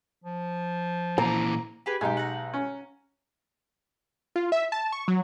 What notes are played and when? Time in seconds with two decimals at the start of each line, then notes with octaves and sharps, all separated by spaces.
0.24 F3
1.18 A#2 E3 A#5
1.86 G4 G#4 B4
2.01 B1 G#3 D#4 G4 G#4
2.17 F#5 A#5
2.53 C#4
4.36 F4
4.52 E5
4.72 A5
4.93 C#6
5.08 F#3